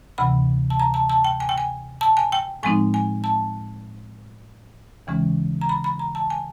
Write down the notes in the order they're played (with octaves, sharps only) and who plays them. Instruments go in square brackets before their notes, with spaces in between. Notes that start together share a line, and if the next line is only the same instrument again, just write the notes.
[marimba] D2 C3 E3 B5
A5
A#5
A5
A5
G5
G#5
G5
G#5
A5
G#5
G5
A2 F3 G#3 C4 D#4 G#5
G#5
A5
D#2 C#3 E3 G#3 C#4
A#5
B5
B5
A#5
A5
G#5